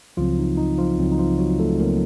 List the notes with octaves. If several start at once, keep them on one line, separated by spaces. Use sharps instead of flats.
C#2 C#3 F3 F#3 C4 F4
D#4
D#4
F3 F4
C#2 C#3 F#3 C4
D#4
F3 F4
F#3 F#4
A3 A4
C#2 C#3 F#3 A#3 C4 A#4